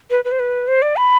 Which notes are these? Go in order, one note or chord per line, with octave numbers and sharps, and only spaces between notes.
B4
B4
C5
B4
C5
D5
B5